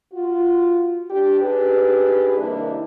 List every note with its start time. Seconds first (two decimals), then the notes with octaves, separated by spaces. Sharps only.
0.13 F4 F#4
1.11 D4 G4
1.41 D4 D#4 G4 G#4 B4
2.38 C3 D#3 G3 A#3 D4 E4